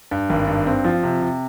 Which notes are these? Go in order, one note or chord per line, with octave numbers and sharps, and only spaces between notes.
G2
G#1
G2
C4
F3
C3
C3